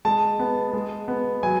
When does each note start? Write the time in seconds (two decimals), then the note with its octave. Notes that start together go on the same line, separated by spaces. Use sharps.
0.05 G#3 A5
0.39 B3
0.73 G#3
1.08 B3
1.43 F#3 G#5